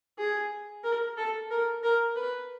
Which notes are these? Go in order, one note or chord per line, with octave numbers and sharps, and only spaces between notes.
G#4
A#4
A4
A#4
A#4
B4